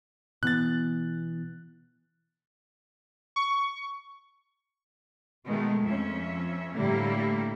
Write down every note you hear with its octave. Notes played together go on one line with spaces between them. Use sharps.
B2 E3 B3 F#6 A6
C#6
B2 D#3 G#3 A3
F2 F3 C#4 E5
A2 D3 G3 A#3 E4